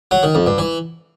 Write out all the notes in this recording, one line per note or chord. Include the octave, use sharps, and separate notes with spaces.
F#3
D#3
F2
G2
E3